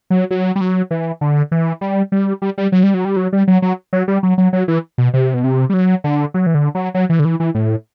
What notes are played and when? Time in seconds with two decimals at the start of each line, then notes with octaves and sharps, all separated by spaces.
0.10 F#3
0.31 F#3
0.56 G3
0.61 F#3
0.91 E3
1.21 D3
1.52 E3
1.81 G3
2.12 G3
2.42 G3
2.58 G3
2.72 F#3
2.83 G3
2.94 F#3
3.05 G3
3.16 F#3
3.33 G3
3.48 F#3
3.62 F#3
3.93 F#3
4.08 G3
4.23 F#3
4.38 F#3
4.53 F#3
4.68 E3
4.98 B2
5.14 C3
5.34 B2
5.44 C3
5.70 G3
5.74 F#3
6.04 D3
6.34 F#3
6.46 E3
6.55 D3
6.75 F#3
6.94 F#3
7.09 E3
7.19 D3
7.25 E3
7.40 E3
7.55 A2